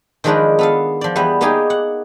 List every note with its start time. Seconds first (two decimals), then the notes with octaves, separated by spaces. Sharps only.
0.24 D#3 F3 G#3 D4 A#4 B4
0.59 B3 A4 F5
1.01 F3 D5
1.16 E2 E3 G3 B3
1.41 A#3 B3 D#4 G4 G#4 A#4
1.70 F#5